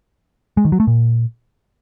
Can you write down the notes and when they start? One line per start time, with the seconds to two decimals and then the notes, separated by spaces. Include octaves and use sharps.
0.57 G#3
0.65 D#3
0.72 F#3
0.80 A3
0.87 A#2